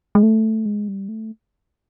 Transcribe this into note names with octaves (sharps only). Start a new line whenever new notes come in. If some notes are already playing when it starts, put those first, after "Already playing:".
G#3
A3
G#3
G3
A3